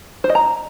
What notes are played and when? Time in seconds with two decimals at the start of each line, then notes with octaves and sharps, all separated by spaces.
0.24 C5
0.30 D#5
0.35 A#5